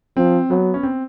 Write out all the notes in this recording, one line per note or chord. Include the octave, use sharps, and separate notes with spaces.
F3 C4
F#3 B3
C#4
C4